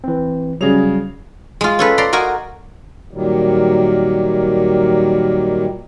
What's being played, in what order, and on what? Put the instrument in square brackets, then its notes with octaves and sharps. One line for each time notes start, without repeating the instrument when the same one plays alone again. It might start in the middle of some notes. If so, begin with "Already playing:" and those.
[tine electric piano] E3 C4
[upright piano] C#3 G#4 F7 [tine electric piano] F#3 G3
[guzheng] G#3 F4
C#4 A4 B4
D5 A#5 C6
F#4 A#4 D#5 G#5
[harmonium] A#2 D#3 F#3 G3